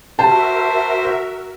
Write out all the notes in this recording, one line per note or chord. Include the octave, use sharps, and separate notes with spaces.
F#4 A#4 C5 E5 A5